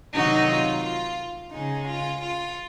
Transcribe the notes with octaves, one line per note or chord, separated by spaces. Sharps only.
C3 D#3 F#3 D#4 F#4
F4
F4
C#3 G#3 D#4
F4
F4